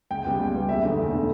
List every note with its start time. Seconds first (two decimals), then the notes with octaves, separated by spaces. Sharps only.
0.10 C#2 G5
0.25 C#3 G3 B3
0.39 C#2
0.55 C#3 G3 B3
0.69 E1 E5
0.84 E2 D3 A3
0.98 E1
1.13 D3 A3